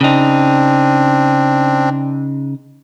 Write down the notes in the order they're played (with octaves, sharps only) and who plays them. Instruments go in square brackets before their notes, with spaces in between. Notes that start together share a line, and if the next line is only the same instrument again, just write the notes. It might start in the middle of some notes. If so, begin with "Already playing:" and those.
[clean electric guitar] C#3 D#4 [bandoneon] C4 D4